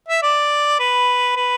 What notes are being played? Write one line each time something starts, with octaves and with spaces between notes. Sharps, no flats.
E5
D5
B4
B4